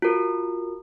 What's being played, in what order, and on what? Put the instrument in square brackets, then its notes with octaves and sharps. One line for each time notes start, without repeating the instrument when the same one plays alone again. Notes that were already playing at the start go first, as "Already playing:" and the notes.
[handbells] F4 F#4 A#4